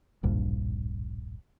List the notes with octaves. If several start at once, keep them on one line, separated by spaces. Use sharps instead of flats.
D1 A#1 G2